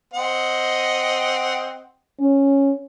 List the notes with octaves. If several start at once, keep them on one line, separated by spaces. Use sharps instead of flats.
C4 D#5 F#5
C#4